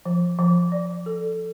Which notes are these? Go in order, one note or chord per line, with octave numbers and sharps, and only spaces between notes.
F3
F3
D5
A4